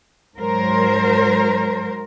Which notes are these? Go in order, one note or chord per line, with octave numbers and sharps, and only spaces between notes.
G#2 F#3 A#4 C5